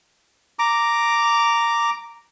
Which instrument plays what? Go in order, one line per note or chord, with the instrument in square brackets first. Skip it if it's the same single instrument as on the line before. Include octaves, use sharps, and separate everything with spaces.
[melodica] A#5 D6